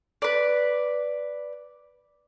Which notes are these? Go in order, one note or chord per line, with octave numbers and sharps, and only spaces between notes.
B4 D5